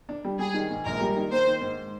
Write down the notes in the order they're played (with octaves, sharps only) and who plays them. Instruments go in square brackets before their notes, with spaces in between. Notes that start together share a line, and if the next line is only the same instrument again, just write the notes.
[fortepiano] D4
G3
[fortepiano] G3 [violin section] G#4
[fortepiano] D#3
G#2
[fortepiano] A#1 [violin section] A#4
[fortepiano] G3
D#3
[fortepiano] A#3 [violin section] C5
[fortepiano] D#3
G#2